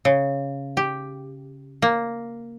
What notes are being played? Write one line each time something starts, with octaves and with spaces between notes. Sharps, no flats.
C#3
G4
A#3